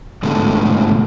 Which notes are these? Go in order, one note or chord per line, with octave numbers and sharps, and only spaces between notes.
G#2 B2 D3 A3